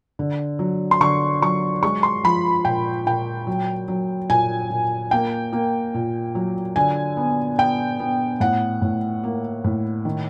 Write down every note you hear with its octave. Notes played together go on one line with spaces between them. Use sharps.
D3
F#3
C6
D3 C#6
F#3 C#6
G#3 C#6
C6
F3 B5
A#2 G5
A#2 G5
F#3
F#3
A#2 G#5
A#2
A#3 G5
A#3
A#2
F#3
D3 G#5
B3
B3 G5
B3
A2 F#5
A2
A#3
A2
D#3